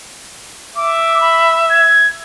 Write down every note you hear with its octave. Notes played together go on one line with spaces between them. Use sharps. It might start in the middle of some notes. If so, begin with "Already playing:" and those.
E5 D6
B5
G#6